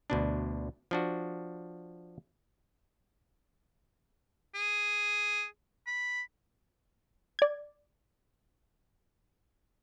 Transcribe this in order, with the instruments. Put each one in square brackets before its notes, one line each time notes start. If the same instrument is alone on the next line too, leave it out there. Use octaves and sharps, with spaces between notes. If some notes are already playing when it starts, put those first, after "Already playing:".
[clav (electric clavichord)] D2 B2 D4
F3 D4 F#4
[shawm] G#4
B5
[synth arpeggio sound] D5 G#6